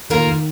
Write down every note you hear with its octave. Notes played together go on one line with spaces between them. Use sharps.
D#3 A#3 F4 A#4
D#3